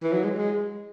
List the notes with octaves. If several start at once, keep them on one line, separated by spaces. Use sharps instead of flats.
E3
F#3
G#3
G#3